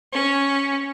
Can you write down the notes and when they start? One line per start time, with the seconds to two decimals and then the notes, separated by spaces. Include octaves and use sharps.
0.12 C#4